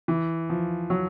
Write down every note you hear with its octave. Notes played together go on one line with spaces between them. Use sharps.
E3
F3
F#3